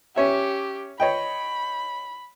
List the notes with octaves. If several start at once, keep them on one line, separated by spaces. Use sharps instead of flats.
C#4 G4 C#5 E5
C#5 D#5 G5 B5